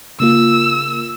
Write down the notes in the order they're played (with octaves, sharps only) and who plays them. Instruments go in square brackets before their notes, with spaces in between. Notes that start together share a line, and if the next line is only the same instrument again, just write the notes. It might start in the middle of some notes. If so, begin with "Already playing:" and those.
[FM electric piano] C#3 A#3 F4 [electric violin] E6